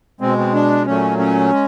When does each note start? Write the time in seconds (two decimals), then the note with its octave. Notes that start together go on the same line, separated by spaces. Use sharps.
0.21 B2 G#3 C4
0.38 C4
0.54 D4
0.86 A#2 F#3 A3 C#4
1.19 C#4
1.52 G#3